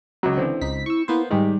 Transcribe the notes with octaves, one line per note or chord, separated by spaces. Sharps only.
C#2 F#3
D3 E3 C4
C#2 D#4 B6
E4 C#6 E6
A#3 B3 E4 C5
G#2 D#3 G3 G#3 G4